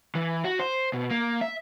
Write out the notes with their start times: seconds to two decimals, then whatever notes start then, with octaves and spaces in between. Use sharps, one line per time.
0.15 E3
0.44 F#4
0.59 C5
0.93 B2
1.11 A#3
1.41 E5